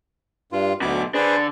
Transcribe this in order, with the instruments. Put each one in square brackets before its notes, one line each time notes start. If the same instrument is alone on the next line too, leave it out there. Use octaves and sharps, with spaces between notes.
[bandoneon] G2 F4
[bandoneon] D2 D6 [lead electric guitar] B2 F#3
[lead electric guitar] D3 D4 [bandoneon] G#4 B4 C5